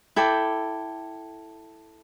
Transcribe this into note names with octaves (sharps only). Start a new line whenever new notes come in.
E4 A4 G5 D6